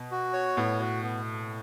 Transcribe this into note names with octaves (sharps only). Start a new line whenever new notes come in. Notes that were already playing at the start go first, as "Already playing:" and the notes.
Already playing: B2
F#4
C#5
A2 B3
F#4
B3